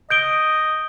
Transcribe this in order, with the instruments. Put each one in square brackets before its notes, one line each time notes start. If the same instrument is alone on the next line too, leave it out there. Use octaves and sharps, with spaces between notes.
[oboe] D#5 [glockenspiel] G6 D7 G7